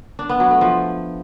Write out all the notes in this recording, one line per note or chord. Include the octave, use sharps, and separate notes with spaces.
D4
B3
F#3
A3
F3